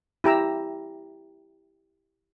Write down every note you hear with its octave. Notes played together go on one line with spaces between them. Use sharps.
E4 G4 A#5 E6